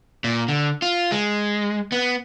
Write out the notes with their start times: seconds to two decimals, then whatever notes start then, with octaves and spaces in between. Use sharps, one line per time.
0.24 A#2
0.48 D3
0.82 F4
1.12 G#3
1.92 B3